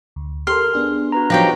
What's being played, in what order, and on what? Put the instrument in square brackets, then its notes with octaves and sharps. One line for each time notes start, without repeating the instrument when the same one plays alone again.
[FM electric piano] D2
[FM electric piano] G4 A4 A#4 [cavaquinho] C6 [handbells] F6
[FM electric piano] B3 D4 G#4
[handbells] F#4 B4 A#5
[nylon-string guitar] F3 F#3 [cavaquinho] D#4 G4 G5 [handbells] A#6